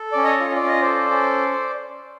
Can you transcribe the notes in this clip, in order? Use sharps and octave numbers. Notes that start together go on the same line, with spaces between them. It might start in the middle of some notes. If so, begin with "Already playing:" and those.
Already playing: A4
C#4 D5
C#5 D#5
F4
D5
C#4 D#5
A4 C5 D5
C#4